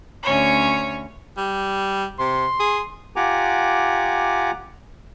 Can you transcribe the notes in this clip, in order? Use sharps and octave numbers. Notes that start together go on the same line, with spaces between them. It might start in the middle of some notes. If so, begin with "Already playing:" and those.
D2 C#4 C#5
G3
C3 C6
G#4
F4 G4 F#5 G#5 A#5 D6